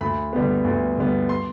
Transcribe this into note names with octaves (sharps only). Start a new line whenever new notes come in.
D2 B5
D3 G3 B3
D2
D3 G3 B3
C6